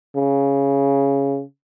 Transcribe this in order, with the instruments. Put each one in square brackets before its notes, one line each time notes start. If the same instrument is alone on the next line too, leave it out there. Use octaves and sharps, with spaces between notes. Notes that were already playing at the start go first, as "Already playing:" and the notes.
[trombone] C#3